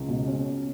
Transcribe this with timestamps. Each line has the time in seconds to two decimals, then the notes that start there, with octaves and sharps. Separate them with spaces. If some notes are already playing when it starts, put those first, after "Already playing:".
Already playing: C#2
0.08 B2
0.27 C#4